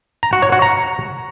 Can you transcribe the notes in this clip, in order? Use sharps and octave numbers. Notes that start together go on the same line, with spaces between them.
A#5
F#4
C#5
F#4
A#5